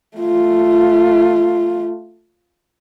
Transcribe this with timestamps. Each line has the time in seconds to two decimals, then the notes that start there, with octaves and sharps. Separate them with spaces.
0.17 A3 F4